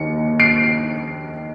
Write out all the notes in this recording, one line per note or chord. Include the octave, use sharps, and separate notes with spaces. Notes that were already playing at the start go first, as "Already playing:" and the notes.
Already playing: D#2 D#3 C#7
C7 D7